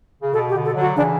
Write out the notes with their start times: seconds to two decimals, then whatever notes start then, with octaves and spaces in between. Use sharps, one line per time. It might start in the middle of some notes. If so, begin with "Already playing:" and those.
0.22 C#3
0.33 B2 A4
0.49 G4
0.55 B2 D3
0.65 A4
0.75 D3 F#3
0.80 F#4
0.96 C#3 E3 D4